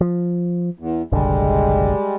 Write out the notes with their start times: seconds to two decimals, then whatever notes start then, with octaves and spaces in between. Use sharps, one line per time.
0.01 F3
0.79 E2
1.12 F#1 B1 D3 G3 G#3